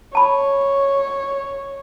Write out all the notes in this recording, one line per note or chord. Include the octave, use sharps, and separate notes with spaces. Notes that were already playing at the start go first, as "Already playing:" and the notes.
C#5 A5 B5